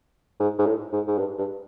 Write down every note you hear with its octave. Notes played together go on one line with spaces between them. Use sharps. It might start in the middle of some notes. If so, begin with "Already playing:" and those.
G#2
G#2
A2
G#2
G#2
G2
G2